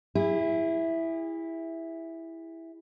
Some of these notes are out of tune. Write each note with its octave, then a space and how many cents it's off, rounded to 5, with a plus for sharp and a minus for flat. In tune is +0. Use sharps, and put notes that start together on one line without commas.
E4 +0 G#4 -40